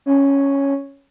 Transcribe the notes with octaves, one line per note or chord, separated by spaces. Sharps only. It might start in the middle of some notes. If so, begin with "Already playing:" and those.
C#4